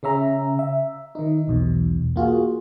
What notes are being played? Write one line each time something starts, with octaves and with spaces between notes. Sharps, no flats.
C#3 C#4 E5 A#5
E5
D#3 D#4
B1 E2 B2
A#3 F4 F#4 G#4